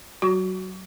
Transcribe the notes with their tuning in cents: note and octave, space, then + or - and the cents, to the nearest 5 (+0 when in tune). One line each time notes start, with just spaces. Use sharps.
F#3 +30 F#4 +0 C#6 +30